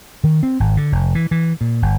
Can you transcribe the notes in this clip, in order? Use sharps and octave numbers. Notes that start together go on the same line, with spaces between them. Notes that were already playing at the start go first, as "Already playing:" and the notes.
D#3
C4
G#1
D3
F1
E3
E3
A#2
G1